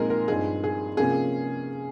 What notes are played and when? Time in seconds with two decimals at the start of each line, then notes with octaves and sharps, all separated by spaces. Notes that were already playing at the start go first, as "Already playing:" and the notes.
Already playing: A#2 F3 G#3 C4 D#4 G#4 A#4
0.10 A#4
0.28 G2 F3 C4 D#4 G#4
0.64 G#4
0.97 C3 F3 A#3 C#4 G#4